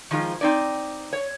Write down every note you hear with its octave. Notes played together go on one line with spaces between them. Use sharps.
D#3 F3 G#3 F4
C4 D#4 D5
C#5